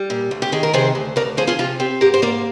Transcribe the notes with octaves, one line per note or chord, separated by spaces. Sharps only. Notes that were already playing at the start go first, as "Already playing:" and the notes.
Already playing: G3
A#2
D2
G4
D#3 G#4
A#4
C3 G#4 C5
D2
D2 A#4 D5
F3 G#4 C5
F4 G#4
C3 F4
C4 G4
G#2 G4 A#4
C5
A#3 A#4 D5